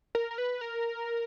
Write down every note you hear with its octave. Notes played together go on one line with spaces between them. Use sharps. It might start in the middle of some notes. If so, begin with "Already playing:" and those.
A#4
A#4
B4
A#4